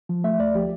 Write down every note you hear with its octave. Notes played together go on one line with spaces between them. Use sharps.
F3
A3 E5
D2 D5
F3 G4